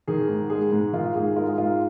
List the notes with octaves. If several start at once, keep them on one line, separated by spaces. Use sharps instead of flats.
D#3 G#4
G#2
G#3 G#4
G#2
D#3 F4
G#2 G#4
G#3 F4 A#4
G#4
G#2 F4